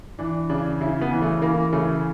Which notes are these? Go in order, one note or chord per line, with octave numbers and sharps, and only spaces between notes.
E3 D4
C#3 D4
C#3 E4
B3
E3
A3
E3 A#3
C#3 A3